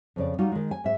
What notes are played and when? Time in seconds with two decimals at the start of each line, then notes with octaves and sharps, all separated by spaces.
0.16 F2 C#3 D5
0.38 G3 D#4 F4 F#4
0.52 D#3 G#3
0.71 G#5
0.84 G#2 E5